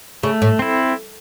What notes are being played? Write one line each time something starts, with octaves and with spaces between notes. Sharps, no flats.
C#3 A3
A2
C4 E4